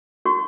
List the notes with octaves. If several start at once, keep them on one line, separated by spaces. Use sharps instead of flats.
F#4 C#6